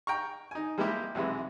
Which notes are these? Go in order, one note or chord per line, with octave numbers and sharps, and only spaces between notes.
G5 A#5 C#6
D#4 G#5
G3 G#3 A#3 E4 G4
B1 C3 E3 G#3